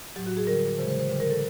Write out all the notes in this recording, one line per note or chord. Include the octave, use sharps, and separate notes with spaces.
A2 F#3 G4
F#4
G#4
D3 G3 A#4
C#3 E3 G#3 C5
C5
C5
D3 G3 B4
A#4
A4